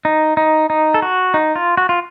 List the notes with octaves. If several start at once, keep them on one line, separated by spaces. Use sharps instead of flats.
D#4
D#4
D#4
A4
F#4
D#4
F4
F#4
F4